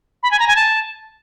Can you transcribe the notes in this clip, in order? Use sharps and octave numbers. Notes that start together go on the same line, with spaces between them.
B5
G#5
A#5
G#5
A5